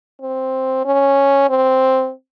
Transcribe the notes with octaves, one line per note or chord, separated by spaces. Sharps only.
C4
C#4
C4